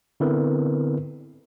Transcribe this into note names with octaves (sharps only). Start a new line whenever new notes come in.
D3 B3 C4 E4 A#4 B4